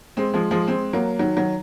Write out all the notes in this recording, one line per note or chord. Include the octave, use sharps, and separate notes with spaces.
G#3 C4
F3 G#3
F3 G#3
G#3 C4
F#3 A#3
D#3 F#3
D#3 F#3